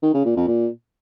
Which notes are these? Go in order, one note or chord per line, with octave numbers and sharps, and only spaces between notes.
D#3
C#3
A#2
F2
A#2